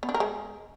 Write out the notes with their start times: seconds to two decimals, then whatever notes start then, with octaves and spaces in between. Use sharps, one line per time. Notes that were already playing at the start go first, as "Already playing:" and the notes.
0.03 B3
0.09 D4
0.14 A#4
0.20 G#3